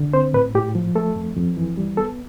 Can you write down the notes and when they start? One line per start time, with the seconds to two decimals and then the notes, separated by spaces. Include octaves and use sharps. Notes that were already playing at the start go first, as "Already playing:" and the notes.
Already playing: D3
0.13 C4 C5
0.34 A2 B4
0.54 A2 G4
0.75 F3
0.95 A3 A4
1.16 F2
1.36 F2
1.57 E3
1.77 G3
1.97 B3 A4